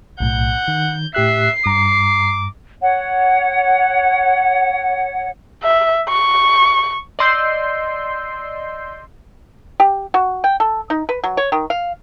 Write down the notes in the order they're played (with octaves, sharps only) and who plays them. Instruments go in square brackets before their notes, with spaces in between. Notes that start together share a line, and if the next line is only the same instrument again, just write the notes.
[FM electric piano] B1 A2 [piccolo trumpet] F#5 [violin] G6
[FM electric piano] D#3
[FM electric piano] A2 G4 F#6 [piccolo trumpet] E5 [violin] C7
[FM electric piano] G2 A#5 [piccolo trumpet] D6
[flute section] C#5 F#5
[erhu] E5
C#6
[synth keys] D5 D#5 C6 E6 G6 C7
[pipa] G4
F#4
G5
A4
D#4
B4
F#3
C#5
D#3
F5